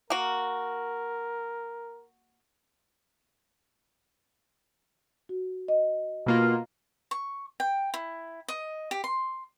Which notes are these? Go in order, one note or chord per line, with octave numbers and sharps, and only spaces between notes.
A#3 F#4 A#4
F#4
D#5
B2 A#3 F4
C#6
G5
E4
D#5
G4
C6